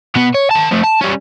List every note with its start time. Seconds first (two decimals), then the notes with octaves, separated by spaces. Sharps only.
0.16 B2 B3
0.34 C#5
0.51 D#3 A5
0.71 F3 A3
0.83 A5
1.01 G3 C#4